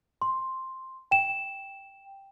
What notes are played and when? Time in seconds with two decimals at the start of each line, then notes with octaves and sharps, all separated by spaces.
0.22 C6
1.11 G5 E7